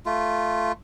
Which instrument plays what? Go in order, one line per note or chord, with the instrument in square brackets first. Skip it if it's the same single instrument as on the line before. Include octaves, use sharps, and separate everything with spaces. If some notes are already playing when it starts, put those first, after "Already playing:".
[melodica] A3 F4